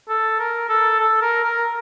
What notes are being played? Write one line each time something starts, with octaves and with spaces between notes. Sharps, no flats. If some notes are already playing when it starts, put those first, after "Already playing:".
A4
A#4
A4
A4
A#4
A#4